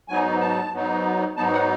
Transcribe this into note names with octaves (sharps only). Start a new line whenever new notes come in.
G#2 F#3 B3 D#4 G#5
A5
G#2 F#3 B3 D#4
G#2 F#3 B3 D#4 A5
F#5